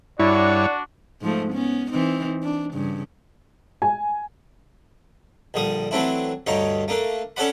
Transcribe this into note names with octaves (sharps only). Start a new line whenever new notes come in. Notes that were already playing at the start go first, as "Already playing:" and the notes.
G2 D4 E4 F#4 C#5 D5
G#2 F3 A3
B3 C#4
E3 C4 D#4
D4
G2 C#3
G#5
A#1 D3 G3 D#6
E3 F#3 A3 C4 D4 E4
D2 G2 D3 D#4 C#5
A3 A#3 D4
C#4 A4 C#5 D5 F#5 B5